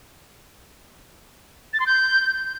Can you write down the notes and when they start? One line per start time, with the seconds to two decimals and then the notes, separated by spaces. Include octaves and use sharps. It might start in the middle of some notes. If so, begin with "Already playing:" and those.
1.73 A6
1.80 C6
1.87 G6